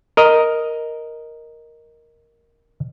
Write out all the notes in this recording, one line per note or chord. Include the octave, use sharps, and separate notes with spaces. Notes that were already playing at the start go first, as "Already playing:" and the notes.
A#4 D#5